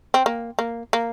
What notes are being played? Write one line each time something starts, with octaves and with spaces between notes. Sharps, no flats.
C4
A#3
A#3
A#3